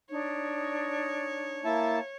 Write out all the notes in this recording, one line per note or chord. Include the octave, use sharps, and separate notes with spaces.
D4 D#4 C#5
A#3 E4 A5